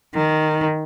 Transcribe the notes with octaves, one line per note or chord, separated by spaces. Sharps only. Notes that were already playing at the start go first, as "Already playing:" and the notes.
D#3